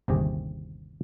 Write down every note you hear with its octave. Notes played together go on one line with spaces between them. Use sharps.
G1 D#2 C3 G4 G#4